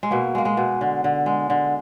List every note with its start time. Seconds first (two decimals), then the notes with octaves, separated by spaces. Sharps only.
0.03 G#3
0.11 B2 A#3
0.35 G#3 A#3
0.45 G#3
0.57 B2
0.81 D3
1.04 D3
1.26 G#3
1.50 D3